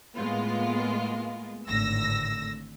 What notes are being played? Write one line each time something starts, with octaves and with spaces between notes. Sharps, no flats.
A2 G#3 A#3 B3 F4
G#1 A2 D3 E6 A#6